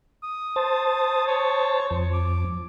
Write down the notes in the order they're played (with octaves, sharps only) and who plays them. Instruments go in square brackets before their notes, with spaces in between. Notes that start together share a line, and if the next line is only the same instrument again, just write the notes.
[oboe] D#6
[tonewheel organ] C5 A5
[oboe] C#5
[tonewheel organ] F2
[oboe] D6